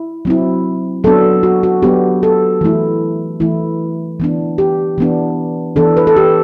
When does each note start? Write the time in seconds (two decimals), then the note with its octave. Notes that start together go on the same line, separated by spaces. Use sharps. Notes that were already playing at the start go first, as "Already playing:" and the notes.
Already playing: E4
0.25 F#3 C4 E4
1.04 F#3 B3 D4 A4
1.43 F#4
1.63 F#4
1.82 F#3 B3 D4 G4
2.23 A4
2.61 E3 A3 E4
3.40 E3 A3 E4
4.20 E3 B3 D4
4.58 G4
4.98 E3 B3 D4
5.76 E3 B3 D4 A4
5.97 B4
6.07 A4
6.17 G4